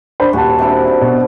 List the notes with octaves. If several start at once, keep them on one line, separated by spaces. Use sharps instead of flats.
D4 C5 B5
D#1 F#4 A5
C3 D4 E4
B2